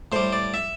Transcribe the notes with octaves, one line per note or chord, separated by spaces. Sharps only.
A2 G3 C5
D5
E5